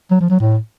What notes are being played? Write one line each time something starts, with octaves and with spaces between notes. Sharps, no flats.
F#3
F3
F#3
A2